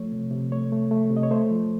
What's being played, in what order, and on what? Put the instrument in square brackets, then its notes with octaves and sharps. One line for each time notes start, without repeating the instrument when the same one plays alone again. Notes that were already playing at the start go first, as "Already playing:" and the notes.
Already playing: [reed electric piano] F3 A3 C#5
C3
C3
A3 C#5
A3
A3
C3
D#5
C#5
A3 C5
F3